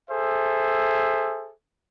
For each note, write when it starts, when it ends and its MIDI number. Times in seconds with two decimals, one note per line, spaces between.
0.10 1.52 68
0.10 1.52 69
0.10 1.52 72
0.10 1.52 76